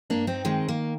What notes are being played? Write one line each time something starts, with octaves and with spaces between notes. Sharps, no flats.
G2 A#3 D4
C4 D#4
D#3 G#3 C4
A#3